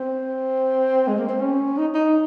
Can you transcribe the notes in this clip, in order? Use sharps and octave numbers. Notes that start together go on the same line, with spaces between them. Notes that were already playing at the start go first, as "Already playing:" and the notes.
Already playing: C4
G#3
A#3
C4
C#4
D#4
D#4